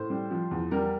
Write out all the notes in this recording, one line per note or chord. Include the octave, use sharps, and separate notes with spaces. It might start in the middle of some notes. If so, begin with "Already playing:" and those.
Already playing: A2 C5
G3
F3
E2
G3 A#4